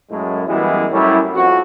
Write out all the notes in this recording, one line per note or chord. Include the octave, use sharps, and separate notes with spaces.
F#2 A2 G#3
F#2 E3 G3 G#3 B3 E4
F#2 A2 G3 C#4 E4
F2 F#4